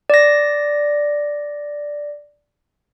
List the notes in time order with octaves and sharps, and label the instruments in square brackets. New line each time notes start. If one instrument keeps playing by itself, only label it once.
[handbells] D5 A#6